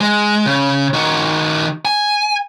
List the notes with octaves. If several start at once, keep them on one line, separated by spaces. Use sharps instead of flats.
G#3
C#3
D#3 F#4
G#5